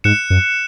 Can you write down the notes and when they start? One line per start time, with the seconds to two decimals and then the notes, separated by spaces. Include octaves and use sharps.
0.04 G#2 F#6 C#7 E7
0.30 F#2